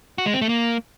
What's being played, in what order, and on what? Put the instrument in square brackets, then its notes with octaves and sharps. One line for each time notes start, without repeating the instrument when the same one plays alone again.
[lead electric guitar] F#4
G#3
C4
A3
A#3